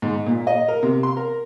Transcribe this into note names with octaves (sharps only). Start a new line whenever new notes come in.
G#2
A#2
D#5
A#4
C3
C6
A#4